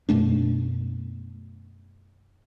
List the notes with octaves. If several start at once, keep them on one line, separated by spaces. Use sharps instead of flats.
F#2 B2 A3 D4